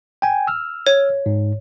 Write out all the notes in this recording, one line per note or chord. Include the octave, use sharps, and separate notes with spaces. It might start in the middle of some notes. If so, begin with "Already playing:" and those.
G5 G#5
E6 F6
C#5
G#2